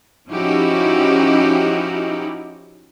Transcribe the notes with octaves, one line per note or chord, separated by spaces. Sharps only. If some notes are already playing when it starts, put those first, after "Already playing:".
F3 C#4 D#4 E4 F#4 G4